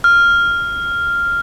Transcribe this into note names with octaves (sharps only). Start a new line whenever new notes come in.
F6